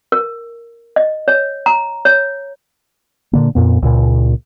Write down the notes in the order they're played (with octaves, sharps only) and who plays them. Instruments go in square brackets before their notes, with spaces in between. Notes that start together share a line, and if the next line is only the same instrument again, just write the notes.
[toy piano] A#4
D#5
C#5
A#5
C#5
[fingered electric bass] A#2 D3 A#3
F2 A#2 B3
C#2 A#2